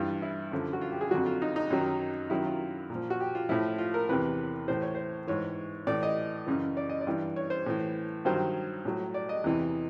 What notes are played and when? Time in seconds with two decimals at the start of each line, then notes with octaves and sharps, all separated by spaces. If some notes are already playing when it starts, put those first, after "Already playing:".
Already playing: G2 E3 F4
0.22 E4
0.51 F#2 D3 F3
0.73 F#4
0.81 F4
0.92 G4
1.01 G#4
1.11 F2 D3 F#3 F#4
1.26 F4
1.42 D#4
1.56 D#4
1.70 F#2 D#3 F#3
2.30 F#2 D#3 F#3 E4
2.45 F4
2.90 A#2
2.95 F3
3.10 F#4
3.20 G4
3.35 F4
3.49 A2 F3 E4
3.79 F4
3.94 A#4
4.09 E2 C3 E3 B4
4.68 A2 E3 C5
4.82 C#5
4.95 C5
5.27 G#2 E3 C#5
5.87 A2 E3 D5
6.03 D#5
6.46 F#2 C#3 E3
6.77 D5
6.89 D#5
7.01 D5
7.07 G2 E3
7.36 C#5
7.50 C5
7.66 A2 E3
8.25 G2 D#3 F#3 C5
8.85 A2 F#3
9.14 D5
9.29 D#5
9.44 E2 C3 E3